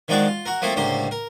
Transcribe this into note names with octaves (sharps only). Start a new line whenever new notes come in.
D#3 F3 G#3 D4 F#4 D5
F4
F#4 A#4
F3 A3 A#3 C4 E4 A4
C#2 A2 D3 A#3 G4 C5
A#4